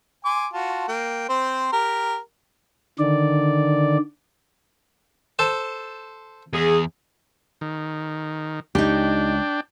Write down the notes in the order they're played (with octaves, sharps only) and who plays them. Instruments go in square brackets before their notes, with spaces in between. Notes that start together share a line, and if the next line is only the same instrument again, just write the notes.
[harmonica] G#5 C6 D6
F4 F#4 A5
A#3 G5
C4 C5
G4 A#4
[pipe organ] D3 D#3 D5
[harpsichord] A4 C5 A5
[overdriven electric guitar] E2 [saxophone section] G#4
[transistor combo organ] D#3
[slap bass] C#2 [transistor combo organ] D4 G5 [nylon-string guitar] D#4 G4